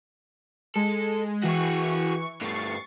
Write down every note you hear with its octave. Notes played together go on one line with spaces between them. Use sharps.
G#3 A4
E3 F#4 G#4 C#6
G2 A3 C#6 A6 C7